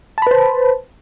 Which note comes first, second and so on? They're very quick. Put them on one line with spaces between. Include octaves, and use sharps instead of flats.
A5 B5 B4 C5